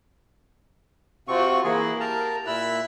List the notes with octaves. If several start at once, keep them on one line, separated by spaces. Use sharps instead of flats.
C3 C4 F4 F#4 C#6
E3 A#3 E4 G#4
G4 A#4 A5 A#5
A#2 E4 E5 F#6